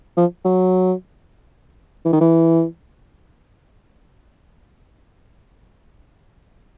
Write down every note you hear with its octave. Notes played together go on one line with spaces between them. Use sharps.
F3
F#3
E3
D#3
E3